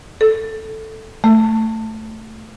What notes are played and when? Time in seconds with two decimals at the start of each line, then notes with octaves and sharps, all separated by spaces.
0.21 A4
1.24 A3